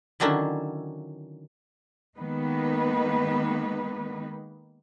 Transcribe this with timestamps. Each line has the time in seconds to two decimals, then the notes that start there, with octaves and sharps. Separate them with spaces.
0.20 D3 D#3 F#3 C#4 D4 E4
2.18 D#3 G#3 A#3 B3 D#4 B4